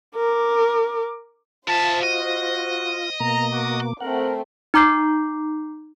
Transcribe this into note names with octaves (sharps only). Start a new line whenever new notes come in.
A#4 D6
F3 F4 C5 E5 A5
F#4 D#5
B2 A#3 A#5
F#4 D6
A3 C4 A#4 F#5
D#4 A#5 D6 G6 C7